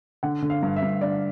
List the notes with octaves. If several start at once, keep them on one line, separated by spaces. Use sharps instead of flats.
D3 F#5
D3
F5
G2
E5
G2
D3 D5